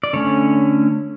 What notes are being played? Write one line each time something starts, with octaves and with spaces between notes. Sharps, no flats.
D5
D3 A3 C#4 C#5